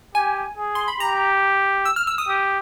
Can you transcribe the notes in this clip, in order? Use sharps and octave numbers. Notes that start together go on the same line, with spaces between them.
G4 G#5
G#4
C6
B5
G4 A#5
E6
F6
E6
D#6
G4